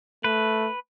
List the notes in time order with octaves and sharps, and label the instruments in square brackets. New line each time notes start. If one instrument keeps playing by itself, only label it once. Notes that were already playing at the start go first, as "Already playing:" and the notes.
[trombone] A3 [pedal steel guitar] B4